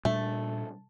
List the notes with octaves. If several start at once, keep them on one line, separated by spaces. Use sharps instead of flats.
A#2 G3 A3 D4